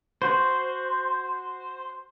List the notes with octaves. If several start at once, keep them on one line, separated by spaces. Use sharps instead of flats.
F#4 C5